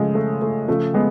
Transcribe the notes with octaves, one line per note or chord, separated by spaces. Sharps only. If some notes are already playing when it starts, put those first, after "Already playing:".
Already playing: C#3 F3 G#3 A3
A3
A3
C#3 F3 A3
G#3 B3